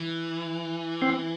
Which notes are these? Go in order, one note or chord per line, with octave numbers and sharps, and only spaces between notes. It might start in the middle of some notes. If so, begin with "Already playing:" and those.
Already playing: E3
C4